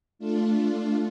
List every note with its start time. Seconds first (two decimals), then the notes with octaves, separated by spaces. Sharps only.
0.19 A3 D4 F4